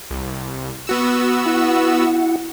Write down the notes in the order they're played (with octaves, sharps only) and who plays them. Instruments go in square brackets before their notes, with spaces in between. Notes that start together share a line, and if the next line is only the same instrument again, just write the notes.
[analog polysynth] C2
B3 F#4 E6
[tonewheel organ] E4 F#5